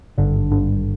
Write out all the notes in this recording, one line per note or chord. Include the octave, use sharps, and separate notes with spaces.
G#1 G2 D3
G#1 G2 D3